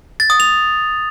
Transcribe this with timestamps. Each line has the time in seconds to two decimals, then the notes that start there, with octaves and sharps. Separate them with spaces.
0.20 A6
0.30 D#6
0.40 F7